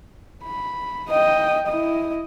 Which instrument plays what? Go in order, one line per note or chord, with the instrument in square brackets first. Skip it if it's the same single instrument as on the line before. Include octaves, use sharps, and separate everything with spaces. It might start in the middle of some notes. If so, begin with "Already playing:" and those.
[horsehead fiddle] B5
D#5 G5
E4 D#5